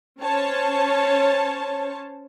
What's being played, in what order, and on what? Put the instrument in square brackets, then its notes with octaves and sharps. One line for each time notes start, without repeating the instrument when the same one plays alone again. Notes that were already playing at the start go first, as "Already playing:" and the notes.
[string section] C#4 C5 C#5 A5